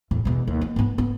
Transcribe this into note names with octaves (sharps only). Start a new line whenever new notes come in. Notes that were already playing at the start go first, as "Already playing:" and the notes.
E2 A2
E2 B2
D#2
B3
G#2 B3
B3